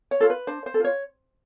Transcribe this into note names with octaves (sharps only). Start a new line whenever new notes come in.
C#5
F4 A4
B4
D4 C5
C5
A4
F4 C#5